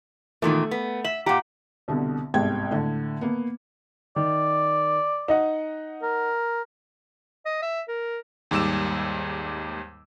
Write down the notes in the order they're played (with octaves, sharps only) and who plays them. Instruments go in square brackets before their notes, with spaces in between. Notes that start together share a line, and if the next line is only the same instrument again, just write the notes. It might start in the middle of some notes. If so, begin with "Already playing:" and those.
[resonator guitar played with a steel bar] E2 A#2 D#3 [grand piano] A3
[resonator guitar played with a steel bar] B3
[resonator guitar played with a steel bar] E5 [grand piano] F#7
[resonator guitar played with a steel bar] A#2 G4 [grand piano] F#5 A#5
[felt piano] C2 B2 D3
G1 C2 G#2 G5 G#6
A2 D3
A#3 B3
[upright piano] D#3 [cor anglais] D5
[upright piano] D#4 D#5 F#5
[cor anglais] A#4
[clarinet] D#5
E5
A#4
[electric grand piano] D#2 G#2 G3 D6 E6 E7